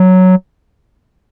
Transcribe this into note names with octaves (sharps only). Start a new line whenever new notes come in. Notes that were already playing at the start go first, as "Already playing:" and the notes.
Already playing: F#3